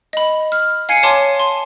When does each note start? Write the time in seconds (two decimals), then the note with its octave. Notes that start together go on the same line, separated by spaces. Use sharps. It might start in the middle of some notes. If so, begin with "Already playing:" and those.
0.13 D#5 B5
0.52 F6
0.89 F5 G#5 G#6 C7 C#7 D#7
1.03 C#5 G#5 A5 C6 D6
1.40 C6